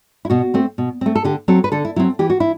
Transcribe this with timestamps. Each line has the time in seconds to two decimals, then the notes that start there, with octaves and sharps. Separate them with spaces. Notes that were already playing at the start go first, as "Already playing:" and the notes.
0.25 E4
0.30 B2 F#4
0.54 A3 C4
0.78 B2
1.01 A3 C4
1.15 A4
1.24 D3 G4
1.48 F#3 C4 A4
1.64 B4
1.72 D3 A4
1.85 E4
1.96 F#3 C4 E4
2.19 E3 G4
2.30 F#4
2.40 E4